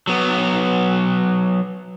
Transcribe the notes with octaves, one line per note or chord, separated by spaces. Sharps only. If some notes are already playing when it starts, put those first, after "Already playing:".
F#3 B3